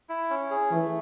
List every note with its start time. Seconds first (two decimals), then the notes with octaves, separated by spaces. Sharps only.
0.09 E4
0.30 C#4
0.51 G#4
0.71 E3 A3